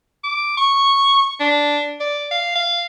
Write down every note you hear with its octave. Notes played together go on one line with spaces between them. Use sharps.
D6
C#6
D4
D5
F5
F5